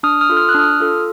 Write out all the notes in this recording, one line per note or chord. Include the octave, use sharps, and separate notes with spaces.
D4 D#6 F6
D#6 F6
F4 A4
F6
F#6
D4 D#6 F6
F4 A4